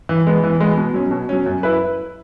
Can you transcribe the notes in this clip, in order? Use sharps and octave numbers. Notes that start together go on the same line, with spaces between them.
E3
G#3 B3
E3
G#3 B3
B2
F#3 C#4
B2
F#3 C#4
F#2
E4 B4